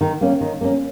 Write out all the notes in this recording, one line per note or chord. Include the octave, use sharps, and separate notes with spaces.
D#3
A#3 C#4
D#3
A#3 C#4